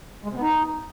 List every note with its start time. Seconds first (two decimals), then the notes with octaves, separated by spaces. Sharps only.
0.25 G#3
0.30 C3
0.36 B3
0.42 D#4